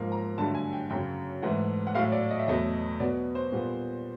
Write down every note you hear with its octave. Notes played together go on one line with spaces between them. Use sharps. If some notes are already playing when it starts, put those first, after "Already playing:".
Already playing: G#2 F3 A#3
A#5
G2 D3 F#3 A3 A5
G#5
G5
F#2 C#3 F#3 G5
G#2 E3 A3 F#5
F#5
A2 F#3 A3 F5
D5
D#5
E5
E2 B2 F#3 A3 D#5
B2 F#3 B3 D5
C5
A#2 G3 B3